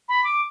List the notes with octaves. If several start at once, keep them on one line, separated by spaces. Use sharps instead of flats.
B5
D6